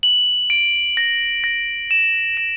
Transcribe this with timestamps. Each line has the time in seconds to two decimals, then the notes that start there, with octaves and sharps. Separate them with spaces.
0.03 F#7
0.50 D7
0.97 A#6
1.44 A#6
1.91 E7
2.37 E7